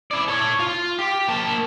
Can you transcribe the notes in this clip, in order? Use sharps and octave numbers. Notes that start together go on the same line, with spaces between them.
E4 D5
A4 C#5
F4
G4
A#3 A5